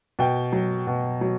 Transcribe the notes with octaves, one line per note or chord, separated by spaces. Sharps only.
B2 G5
F#3
B2
F#3